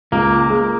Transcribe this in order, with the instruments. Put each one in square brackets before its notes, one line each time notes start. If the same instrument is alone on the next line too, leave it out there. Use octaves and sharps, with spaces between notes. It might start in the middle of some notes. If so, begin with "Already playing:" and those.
[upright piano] C#2 [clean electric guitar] A#3
[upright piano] G#3